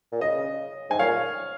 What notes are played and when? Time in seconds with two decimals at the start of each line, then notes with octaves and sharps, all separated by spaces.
0.12 A#2
0.21 C#3 D#5
0.90 G#2 G#5
0.99 A#2 C#5 F5